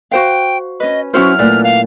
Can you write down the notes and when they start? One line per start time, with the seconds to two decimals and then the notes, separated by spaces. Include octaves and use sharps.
0.12 F#4 C5 F5 G5
0.80 C#4 B4 D#5
1.14 F#3 C#4 E4 F#4 C5 F6
1.39 A#2 A3 B4 D5
1.64 F5